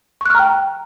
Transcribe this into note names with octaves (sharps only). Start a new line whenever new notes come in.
G5 A#5 C#6 F6 F#6